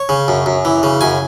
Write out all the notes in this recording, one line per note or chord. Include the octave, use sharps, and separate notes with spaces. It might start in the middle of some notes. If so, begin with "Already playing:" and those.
Already playing: C#5
C#3
F#2
F#2
E3
C#3
F#2 G#5